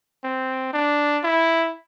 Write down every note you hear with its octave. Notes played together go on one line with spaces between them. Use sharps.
C4
D4
E4